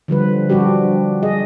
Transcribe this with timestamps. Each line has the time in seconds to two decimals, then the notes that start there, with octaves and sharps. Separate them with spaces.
0.08 D3 F3 G3 B4
0.49 F3 G3 D4 F#4 G4
1.23 G#4 D#5